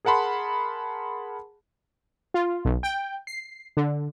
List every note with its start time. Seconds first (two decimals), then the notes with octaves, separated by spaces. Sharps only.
0.05 G#4 A#4 F#5 A5 B5 C6
2.34 F4
2.65 B1
2.83 G5
3.27 C7
3.77 D3